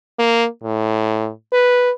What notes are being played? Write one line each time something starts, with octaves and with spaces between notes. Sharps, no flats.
A#3
A2
B4